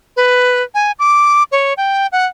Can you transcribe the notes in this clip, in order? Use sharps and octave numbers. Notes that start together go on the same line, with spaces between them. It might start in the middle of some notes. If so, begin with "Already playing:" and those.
B4
G#5
D6
C#5
G5
F#5